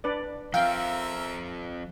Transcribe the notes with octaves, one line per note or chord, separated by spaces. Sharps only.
D4 B4 D5
F3 C4 A#4 E5 F5 G5